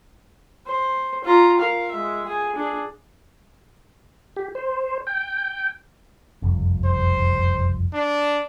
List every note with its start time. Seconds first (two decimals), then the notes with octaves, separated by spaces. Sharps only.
0.66 C5
1.24 F4 A#5
1.59 A#4 F5
1.91 G#3 E5
2.26 G#4 G#5
2.55 D4 G#4
4.36 G4
4.55 C5
5.07 G5
6.42 F#1 C2 F2
6.85 C5
7.93 D4